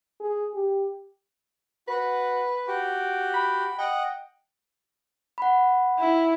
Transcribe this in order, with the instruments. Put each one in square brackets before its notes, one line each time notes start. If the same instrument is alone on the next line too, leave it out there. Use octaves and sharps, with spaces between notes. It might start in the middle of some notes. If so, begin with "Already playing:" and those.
[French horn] G#4
G4
[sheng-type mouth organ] F#4 [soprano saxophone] B4
[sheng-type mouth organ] F#4 G4
[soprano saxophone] B5
[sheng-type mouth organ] D#5 F#5 [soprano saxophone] G5
[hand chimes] F#5 B5
[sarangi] E4